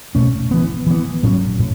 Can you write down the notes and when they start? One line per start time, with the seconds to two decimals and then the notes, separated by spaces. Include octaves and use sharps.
0.15 B2 A3 C#4
0.51 E3 B3
0.87 E3 B3
1.23 A2 F#3 C#4
1.59 A2